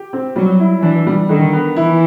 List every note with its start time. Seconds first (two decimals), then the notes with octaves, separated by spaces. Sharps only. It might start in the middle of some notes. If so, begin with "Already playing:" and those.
Already playing: G4
0.13 C4
0.36 F#3 G3
0.60 E4
0.82 E3 D4
1.07 G3
1.29 D3 D#3
1.53 B3
1.76 E3 E4